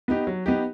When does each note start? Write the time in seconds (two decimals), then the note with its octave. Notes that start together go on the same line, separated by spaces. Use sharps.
0.08 B3 D#4 G4
0.27 F#3
0.46 B3 D#4 G4